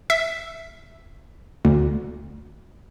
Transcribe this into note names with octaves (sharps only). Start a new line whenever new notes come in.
E5
D2